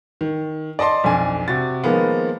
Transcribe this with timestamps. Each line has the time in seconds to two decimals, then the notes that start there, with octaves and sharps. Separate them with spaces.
0.21 D#3
0.79 D5 D#5 A5 C6
1.04 B1 F2 D4 G#5
1.48 C3 F#4 A6
1.84 D#3 F3 G#3 A#3 B3